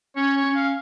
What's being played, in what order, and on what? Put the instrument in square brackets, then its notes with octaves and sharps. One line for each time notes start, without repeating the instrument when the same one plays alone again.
[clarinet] C#4 [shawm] C#5
[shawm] C#5
[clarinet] C#4
[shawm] F5